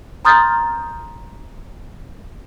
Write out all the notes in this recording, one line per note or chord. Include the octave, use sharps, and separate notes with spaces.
A#5 C6 D#6 F6 G6 A6